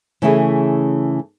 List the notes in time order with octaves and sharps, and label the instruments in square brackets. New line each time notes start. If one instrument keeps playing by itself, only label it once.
[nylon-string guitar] C#3 E3 A3 C#4 E4 G#4